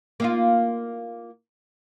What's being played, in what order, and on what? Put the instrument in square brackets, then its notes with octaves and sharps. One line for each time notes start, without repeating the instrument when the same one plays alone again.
[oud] A#3 D#4 F4